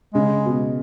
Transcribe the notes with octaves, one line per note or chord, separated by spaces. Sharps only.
C#3 G#3
B2